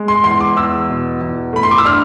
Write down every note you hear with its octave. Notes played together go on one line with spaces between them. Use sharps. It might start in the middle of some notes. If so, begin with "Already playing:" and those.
Already playing: G#3
C6
E2 C6
D6
E2 E6
B2
E2
A3 B5
C6
D6
E6
D4 F6